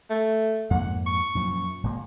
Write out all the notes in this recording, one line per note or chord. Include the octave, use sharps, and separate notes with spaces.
A3
F2 G#2 A#3 F#5
C#6
F#2 A#2 F3
G#1 A#2 G#3